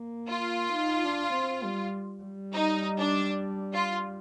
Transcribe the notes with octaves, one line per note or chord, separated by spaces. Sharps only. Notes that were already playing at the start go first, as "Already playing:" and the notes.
Already playing: A#3
F4
D#4
D4
C4
G3
G3
D#4
D4
F4